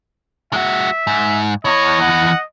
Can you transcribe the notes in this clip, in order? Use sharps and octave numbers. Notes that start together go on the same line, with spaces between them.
G#3 F#4 E5
G#2
E2 E3 C#5 D#5
F#5